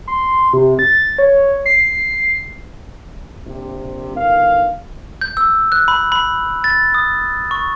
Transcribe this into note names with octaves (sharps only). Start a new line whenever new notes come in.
C6
C3
A6
C#5
C7
A#1 C3
G1 D#4 A#4 F5
G6
E6
F#6
B5
B5
A6
D#6
C#6